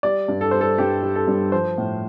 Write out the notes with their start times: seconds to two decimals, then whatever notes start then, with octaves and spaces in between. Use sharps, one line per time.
0.03 G3 D5
0.28 G2
0.41 A4
0.51 G3 C5
0.61 A4
0.78 G2 G4
1.03 G3
1.15 A4
1.27 G2
1.52 F3 C5
1.78 A2